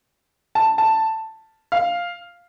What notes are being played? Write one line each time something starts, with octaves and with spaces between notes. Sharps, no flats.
A5
A5
F5